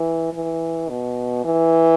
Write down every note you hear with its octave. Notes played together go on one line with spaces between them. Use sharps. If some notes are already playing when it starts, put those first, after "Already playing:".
Already playing: E3
E3
B2
E3